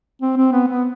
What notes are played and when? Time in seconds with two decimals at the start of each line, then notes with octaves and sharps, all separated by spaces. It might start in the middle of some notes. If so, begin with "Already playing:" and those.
0.22 C4
0.37 C4
0.52 B3
0.67 B3